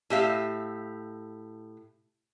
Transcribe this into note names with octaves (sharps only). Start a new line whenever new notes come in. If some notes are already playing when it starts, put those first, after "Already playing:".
A2 G4 E5 F5